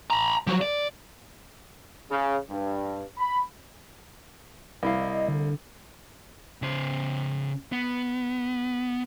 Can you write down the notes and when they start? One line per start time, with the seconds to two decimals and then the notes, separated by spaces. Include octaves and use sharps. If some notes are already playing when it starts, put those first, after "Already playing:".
0.10 A#5 B5
0.47 F3 F#3
0.61 D5
2.10 C#3
2.50 G2
3.18 B5
4.83 C2 E4 F5
5.00 D#5
5.28 D3
6.62 C#3 C5
7.72 B3